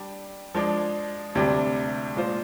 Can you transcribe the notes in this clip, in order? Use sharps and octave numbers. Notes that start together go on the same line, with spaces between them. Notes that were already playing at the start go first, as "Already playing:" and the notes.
Already playing: G3 D4 G4
F3 G#3 D4
D2 C3 G3 D4
A#2 G#3 D4 F4 C5